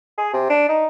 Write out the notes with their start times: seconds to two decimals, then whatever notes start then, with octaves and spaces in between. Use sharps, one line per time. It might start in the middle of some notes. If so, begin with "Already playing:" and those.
0.18 G#4
0.33 C3
0.50 D4
0.69 D#4